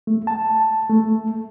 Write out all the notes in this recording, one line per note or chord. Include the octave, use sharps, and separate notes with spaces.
A3
A5
A3